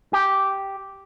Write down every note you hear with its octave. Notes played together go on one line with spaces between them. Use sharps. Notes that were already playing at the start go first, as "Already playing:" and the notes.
G4